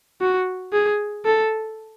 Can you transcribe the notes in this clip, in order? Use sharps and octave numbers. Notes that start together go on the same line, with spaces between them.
F#4
G#4
A4